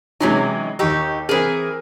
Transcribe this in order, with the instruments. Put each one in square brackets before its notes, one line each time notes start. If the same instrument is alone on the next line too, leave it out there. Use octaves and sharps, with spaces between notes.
[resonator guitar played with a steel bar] C3 E3 F#3 [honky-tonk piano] G#3 C#4 D#4
[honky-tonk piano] D#2 C#6 E6 [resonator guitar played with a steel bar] D#4 G4
[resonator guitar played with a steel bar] E3 G#4 [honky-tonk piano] C4 A#4